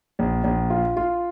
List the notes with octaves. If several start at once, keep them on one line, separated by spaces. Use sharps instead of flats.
A#1
A#1
F4
F4